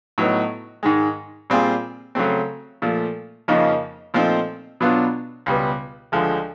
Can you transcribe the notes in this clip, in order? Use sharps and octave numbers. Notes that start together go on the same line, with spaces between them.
A2 F#3 B3 D#4
G#2 D#3 G#3
A#2 G3 C4 F4 G#4
C#3 F#3 A3 C4
A#2 F3 A3
F2 C#3 F3 A#3 D#4
A#2 F3 A3 C4 D#4
B2 F#3 B3 D4 F4
C#2 B2 G3 B3
D2 D3 F3 G#3